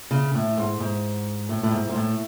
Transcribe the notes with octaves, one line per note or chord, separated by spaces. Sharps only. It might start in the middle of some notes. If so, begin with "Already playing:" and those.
C#3
A2
G#2
G#2
A2
A2
G#2
G#2
A2